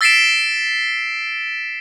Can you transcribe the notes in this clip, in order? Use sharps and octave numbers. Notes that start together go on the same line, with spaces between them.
E6 A6 B6 C7 D7 E7